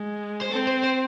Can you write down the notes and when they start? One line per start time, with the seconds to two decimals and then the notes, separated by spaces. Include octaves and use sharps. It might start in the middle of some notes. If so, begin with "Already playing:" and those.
Already playing: G#3
0.41 C5
0.51 C4 A4
0.67 C5
0.83 C5